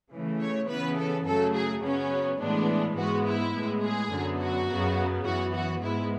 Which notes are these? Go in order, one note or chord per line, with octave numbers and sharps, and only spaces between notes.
C#3 E3 A3
C#5
C#3 E3 B3 B4
A4
F#2 C#3 F#3 A3 A4
G#4
C#3 F#3 B3 C#4
A2 E3 G#3 B3 D4
G#2 G#3 B3 F#4
E4
A2 G#3 B3
G#4
F#2 D3 F#3 B3
F#4
F#2 C#3 F#3 B3
F#2 E3 B3 F#4
F#4
G#2 G#3 B3 E4